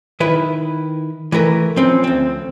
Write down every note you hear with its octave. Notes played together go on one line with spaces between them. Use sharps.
D#3 E4 B4
E3 A3 A#4 B4
F3 C4 C#4
D2 C4